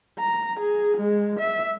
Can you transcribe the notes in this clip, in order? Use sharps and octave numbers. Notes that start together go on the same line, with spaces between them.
A#5
G#4
G#3
E5